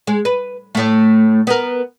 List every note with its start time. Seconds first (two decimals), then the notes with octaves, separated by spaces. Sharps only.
0.07 G#3
0.25 B4
0.75 A2 A3
1.47 B3 A#4